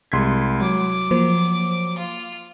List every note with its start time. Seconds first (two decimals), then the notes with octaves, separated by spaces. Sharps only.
0.12 C2 G#3 C6 G#6 B6
0.61 F#3 D6
1.11 F3 A#3 C5
1.98 F4